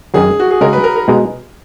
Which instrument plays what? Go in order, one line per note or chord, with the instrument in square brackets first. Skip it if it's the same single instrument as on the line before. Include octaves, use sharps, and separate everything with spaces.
[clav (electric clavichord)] F#2 D#3 F#3 [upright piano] G#4
[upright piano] F#4
G#4
[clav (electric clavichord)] C#3 G#3 D#4 [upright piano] A#4
[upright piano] B4
A#4
A#4
[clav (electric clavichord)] B2 G#3 D#4